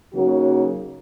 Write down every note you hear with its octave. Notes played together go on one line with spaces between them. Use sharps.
C#3 F#3 A#3 D#4 F#4